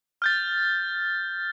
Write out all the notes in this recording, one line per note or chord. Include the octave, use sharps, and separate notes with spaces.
F6 G6 A6